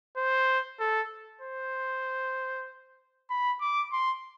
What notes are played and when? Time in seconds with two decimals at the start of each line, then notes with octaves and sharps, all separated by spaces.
0.17 C5
0.80 A4
1.42 C5
3.30 B5
3.61 D6
3.93 C6